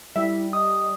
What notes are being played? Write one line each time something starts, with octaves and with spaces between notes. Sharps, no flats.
G3 E4 E5
D#5 D#6